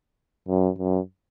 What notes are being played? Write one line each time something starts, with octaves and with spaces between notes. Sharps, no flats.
F#2
F#2